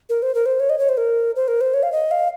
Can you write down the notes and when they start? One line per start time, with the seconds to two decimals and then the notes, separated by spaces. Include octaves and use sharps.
0.09 A#4
0.22 C5
0.35 A#4
0.46 C5
0.60 C#5
0.70 D#5
0.79 C#5
0.89 C5
0.97 A#4
1.36 C5
1.48 A#4
1.61 C5
1.74 C#5
1.83 F5
1.92 D#5
2.11 F5